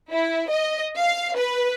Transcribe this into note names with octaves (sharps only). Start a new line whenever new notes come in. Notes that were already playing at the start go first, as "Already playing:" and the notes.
E4
D#5
F5
B4